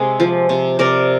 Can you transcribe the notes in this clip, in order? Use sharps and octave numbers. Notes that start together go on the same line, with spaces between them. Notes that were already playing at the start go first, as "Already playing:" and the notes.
Already playing: C3 G#3
F3
C3
C3 A#4 D5